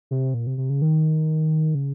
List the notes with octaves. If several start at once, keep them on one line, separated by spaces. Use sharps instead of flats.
C3
A#2
C3
C3
C#3
D#3
C#3